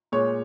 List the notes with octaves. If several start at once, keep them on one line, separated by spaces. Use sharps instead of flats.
A#2 G#3 C#5